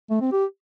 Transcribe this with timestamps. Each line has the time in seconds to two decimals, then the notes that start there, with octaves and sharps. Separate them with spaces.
0.10 A3
0.21 C4
0.32 G4